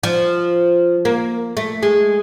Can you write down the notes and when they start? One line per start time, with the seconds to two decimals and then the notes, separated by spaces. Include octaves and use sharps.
0.03 F3
1.05 A#3
1.57 A3
1.83 G#3